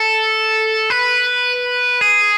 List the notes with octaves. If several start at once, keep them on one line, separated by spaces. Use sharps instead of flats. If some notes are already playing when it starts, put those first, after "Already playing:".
Already playing: A4
B4
G#4